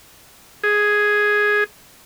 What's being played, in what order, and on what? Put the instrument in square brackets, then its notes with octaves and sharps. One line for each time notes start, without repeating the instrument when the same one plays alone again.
[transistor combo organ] G#4